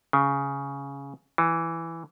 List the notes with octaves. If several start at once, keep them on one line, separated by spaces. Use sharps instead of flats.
C#3
E3